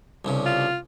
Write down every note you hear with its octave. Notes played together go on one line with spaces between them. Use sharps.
C2 G2 C#3
F4